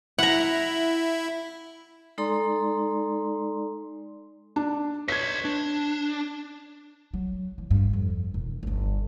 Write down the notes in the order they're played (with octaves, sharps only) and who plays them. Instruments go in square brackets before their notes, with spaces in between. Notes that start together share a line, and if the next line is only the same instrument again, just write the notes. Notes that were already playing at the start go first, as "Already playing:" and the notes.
[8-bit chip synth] E4 [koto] F#5 A#5
[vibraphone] G#3 D#4 A4 D5 A#5 C6
[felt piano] D4
[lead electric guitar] B4 C#5 [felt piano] G#6 B6
[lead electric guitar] D4
[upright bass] F#3
E3
G2
F2
E1
G1 F4